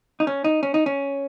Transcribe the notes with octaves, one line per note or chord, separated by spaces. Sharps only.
D#4
C#4
D#4
C#4
D#4
C#4